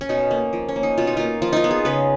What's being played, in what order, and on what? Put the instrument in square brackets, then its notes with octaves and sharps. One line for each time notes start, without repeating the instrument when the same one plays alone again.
[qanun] C#4
B2 D#4
A#3
F3
C#4
A#3
D#4
B2 F4
D#4
A#3 F4
F3 F4
D#4 F4
B3
G#4
C#3 B4